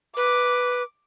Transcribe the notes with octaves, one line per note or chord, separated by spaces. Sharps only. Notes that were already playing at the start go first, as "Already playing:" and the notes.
B4 D6